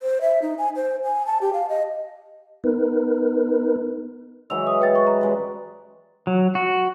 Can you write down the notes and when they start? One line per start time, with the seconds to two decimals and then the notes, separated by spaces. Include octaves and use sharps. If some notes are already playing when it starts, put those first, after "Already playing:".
0.02 C5
0.21 E5
0.42 D#4
0.58 G#5
0.76 C5
1.04 G#5
1.26 A5
1.41 G4
1.53 F5
1.69 D#5
2.64 B3 D#4 A#4 B4
4.50 E3 F#3 G#3 E6 F7
4.67 D#6
4.80 B4 G5 A6
4.95 B4 C#6
5.07 A#5
5.21 G3 G#3 C#4
6.27 F#3
6.55 F#4